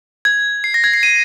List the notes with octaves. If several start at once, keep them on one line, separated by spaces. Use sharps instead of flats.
G#6
C7
A#6
G#6
C7
D#7